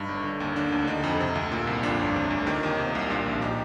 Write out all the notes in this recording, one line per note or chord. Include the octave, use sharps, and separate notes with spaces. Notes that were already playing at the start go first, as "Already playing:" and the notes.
Already playing: G2 D#4
G1
D3
D#2
D3 D4
D2
D4
D3 D#4
F2
C3
D2
A#2
C2
F2 D4 F4
G1
C3
D2
D#3 D#4 G4
D#2
C3
C2
A#2 D4 F4
A#1
D#4 G4